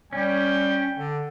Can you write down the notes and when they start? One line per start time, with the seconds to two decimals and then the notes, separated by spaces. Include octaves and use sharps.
0.13 G3 C#4 G5
0.98 D3